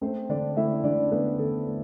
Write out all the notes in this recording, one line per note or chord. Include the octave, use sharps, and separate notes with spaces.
A3 C4 C5
D3 D4 D5
A3 E4 E5
D3 D4 D5
A3 B3 B4
D3 A3 A4
A3